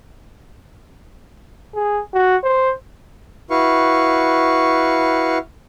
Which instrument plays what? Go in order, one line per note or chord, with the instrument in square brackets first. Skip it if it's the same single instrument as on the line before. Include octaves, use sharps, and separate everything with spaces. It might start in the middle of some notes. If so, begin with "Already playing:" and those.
[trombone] G#4
F#4
C5
[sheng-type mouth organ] E4 F#4 B4 F5 C#6